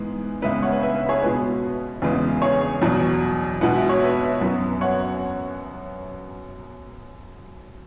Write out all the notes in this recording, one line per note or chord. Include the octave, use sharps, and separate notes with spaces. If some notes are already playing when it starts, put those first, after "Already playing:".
Already playing: G#2 E3 G#3 B3
C#2 C#3 G#3 B3 B4 E5
C#5 F#5
B4 E5
B4 E5
B4
G#4 C#5
B2 G#3 B3 B4
E2 C#3 E3 G#3 B3
G#4 C#5
E2 B2 F#3
B2 G#3 B3 F#5
E5
C#5
B4 E5
F#2 F#3 B3
C#5 F#5